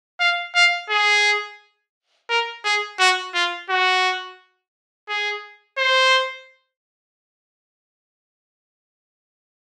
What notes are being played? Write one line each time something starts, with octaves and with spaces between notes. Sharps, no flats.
F5
F5
G#4
A#4
G#4
F#4
F4
F#4
G#4
C5